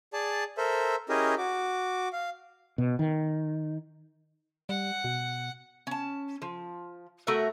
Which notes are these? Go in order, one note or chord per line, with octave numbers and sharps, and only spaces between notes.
G#4 D5 A5
A4 A#4 C5 E5
C#4 E4 G4 G#4 A#4 D#5
F#4 D6
F5
B2
D#3
G3 F#5
B2
C#4 A5
F3
A3 F#4 A#4 E5